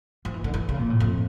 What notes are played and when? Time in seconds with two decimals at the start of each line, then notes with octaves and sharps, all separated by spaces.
0.25 F3
0.34 E3
0.44 D3
0.54 E3
0.69 C#3
0.79 A#2
0.90 A2
1.00 F2